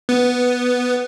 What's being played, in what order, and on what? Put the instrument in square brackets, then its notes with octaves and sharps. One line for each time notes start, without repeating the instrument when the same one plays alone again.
[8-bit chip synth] B3